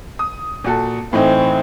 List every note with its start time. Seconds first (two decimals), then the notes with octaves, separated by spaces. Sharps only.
0.19 D#6
0.64 A#2 F#4 A4
1.13 A2 E3 C4 D#4